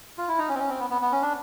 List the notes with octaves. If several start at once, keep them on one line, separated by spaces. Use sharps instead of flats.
F4
E4
D#4
C#4
C4
C#4
C4
B3
B3
B3
C#4
D4